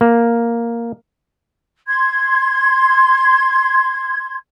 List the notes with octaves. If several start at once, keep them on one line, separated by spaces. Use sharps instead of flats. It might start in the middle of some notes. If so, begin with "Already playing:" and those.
A#3
C6 G#6